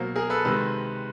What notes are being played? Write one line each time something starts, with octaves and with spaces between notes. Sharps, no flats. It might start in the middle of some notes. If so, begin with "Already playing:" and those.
Already playing: B2 F#3 A#3 A#4 C5
G#4 A#4
A4 B4
C3 D#3 G#3 A4 B4